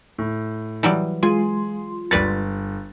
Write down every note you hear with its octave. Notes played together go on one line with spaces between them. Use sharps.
A2
E3 F#3 G3
G#3 F4 G#4 G#5 C6
G1 G3 B4 C#5 A6